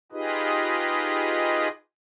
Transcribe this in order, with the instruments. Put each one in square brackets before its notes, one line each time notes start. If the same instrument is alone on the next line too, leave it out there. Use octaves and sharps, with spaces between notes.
[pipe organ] D#4 F4 G4 G#4 B4 D#5